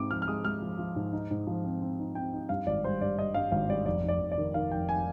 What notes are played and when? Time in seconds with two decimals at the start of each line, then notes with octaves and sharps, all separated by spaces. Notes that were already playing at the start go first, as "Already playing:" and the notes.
Already playing: G#2 C4 D6
0.11 F3 F6
0.22 F6
0.28 G#3 D#6
0.45 G#3 F6
0.62 F3
0.79 F3
0.96 G#2
1.13 D#4
1.31 G#2
1.47 F3
1.65 C4
1.82 C4
1.99 D#4
2.15 C4 G5
2.33 D#4
2.49 G2 F5
2.67 G#1 D5
2.84 G3 C5
3.01 G2 D5
3.18 G3 D#5
3.34 G2 F5
3.52 G#1 F5
3.69 G3 D5
3.86 F1 D5
4.03 F1
4.08 D5
4.20 F1
4.32 D5
4.38 D#3
4.54 D#3 F5
4.71 F1 G5
4.89 G#5